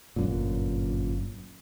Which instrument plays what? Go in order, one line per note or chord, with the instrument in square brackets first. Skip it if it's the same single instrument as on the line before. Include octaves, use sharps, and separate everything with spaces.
[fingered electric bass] G1 F#2 A#2